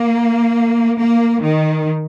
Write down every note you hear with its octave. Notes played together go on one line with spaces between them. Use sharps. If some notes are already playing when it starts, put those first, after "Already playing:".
Already playing: A#3
A#3
D#3